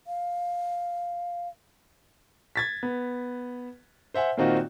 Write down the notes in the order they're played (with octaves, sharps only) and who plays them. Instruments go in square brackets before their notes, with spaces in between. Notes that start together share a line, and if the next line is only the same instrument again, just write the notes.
[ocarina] F5
[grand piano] G#6 A6 B6
B3
C5 E5 F#5 G#5
A#2 D#3 C4 D#4 F4 F#4